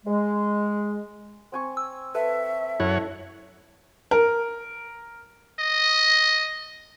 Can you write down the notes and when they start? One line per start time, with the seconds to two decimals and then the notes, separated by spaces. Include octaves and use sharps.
0.06 G#3
1.52 C4 G#5 C#6
1.77 E6
2.15 A4 B4 E5
2.80 F#2 E4 A4 C#5 F#5
4.11 A#4
5.60 D#5